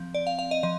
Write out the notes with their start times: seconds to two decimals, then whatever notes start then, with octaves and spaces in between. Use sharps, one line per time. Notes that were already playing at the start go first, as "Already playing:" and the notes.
Already playing: F3 C4
0.14 D5
0.27 F5
0.39 F5
0.51 D#5
0.63 F3 D#5